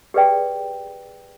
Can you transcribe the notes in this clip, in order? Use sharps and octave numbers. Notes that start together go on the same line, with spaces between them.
G4 G#4 B4 D5 G5